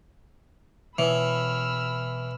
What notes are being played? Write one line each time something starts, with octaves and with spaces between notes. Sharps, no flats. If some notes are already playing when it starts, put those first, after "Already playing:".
B2 E3 C#5 B5 E6 F6